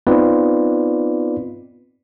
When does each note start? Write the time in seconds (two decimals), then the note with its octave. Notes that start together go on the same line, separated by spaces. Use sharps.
0.07 B3 C4 D#4 F4 B4 D5